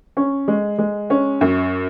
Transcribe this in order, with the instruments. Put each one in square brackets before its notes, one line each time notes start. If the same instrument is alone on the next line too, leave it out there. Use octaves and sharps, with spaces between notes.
[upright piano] C#4
G#3
G#3
C#4
F#2